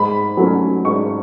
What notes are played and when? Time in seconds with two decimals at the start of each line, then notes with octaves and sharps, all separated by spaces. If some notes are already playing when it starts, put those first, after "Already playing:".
Already playing: G#2 B5
0.37 F#3 A3 C#4
0.85 G#2 C#6